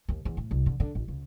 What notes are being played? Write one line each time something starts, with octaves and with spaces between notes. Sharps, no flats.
D#2
E2
A2
C2
D3
D3
A1
C#2